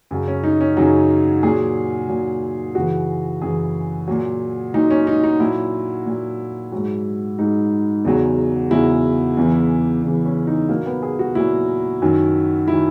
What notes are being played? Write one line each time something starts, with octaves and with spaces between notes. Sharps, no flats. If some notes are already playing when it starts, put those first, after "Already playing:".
F#2 C#3 F#3
C#4
D#4
C#4
F#2 C#3 F#3 D#4
A#2 F#3 G#4
A#2 F#3
F#2 C#3 E3 F#4
F#2 C#3 E3 G#4
A#2 F#3
A#2 F#3 D#4
C#4
D#4
D#4
A#2 F#3 E4
A#2 F#3
G#2 F#3
G#2 F#3 D#4
E2 C#3 F#3
E2 C#3 F#3 E4
E2 C#3 E3
E2 C#3 E3
C#4
D#4
A#2 F#3 A#3
B3
G#4
F#4
A#2 F#3 E4
F#2 D#3 F#3
D#3 F#3 E4